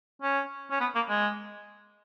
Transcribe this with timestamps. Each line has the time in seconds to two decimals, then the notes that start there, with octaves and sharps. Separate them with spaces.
0.22 C#4
0.71 C#4
0.80 B3
0.95 A#3
1.09 G#3